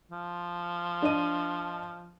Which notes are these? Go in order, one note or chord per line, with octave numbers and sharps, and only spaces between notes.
F3
D4 D#5 D#7